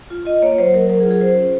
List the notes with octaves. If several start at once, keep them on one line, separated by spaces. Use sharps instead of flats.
F4
F4 D#5
A#3 C#5
F#3 C5
F#3 A#4
F#3 A#4
G#4
F4
G#4
C#4 C5
C#4